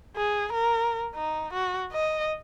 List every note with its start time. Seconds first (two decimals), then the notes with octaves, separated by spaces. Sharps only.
0.16 G#4
0.53 A#4
1.15 D#4
1.53 F#4
1.92 D#5